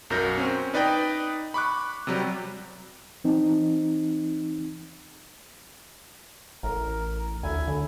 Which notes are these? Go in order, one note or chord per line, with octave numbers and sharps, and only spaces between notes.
B1 F#2 F#3 A#4 G6 A#6
C4 C#4
D#4 B4 D5 D#5 G5
B5 C#6 D6 F#6
C3 F#3 G3
E3 C4 D#4
A1 A#4
D2 E4 G#5
D3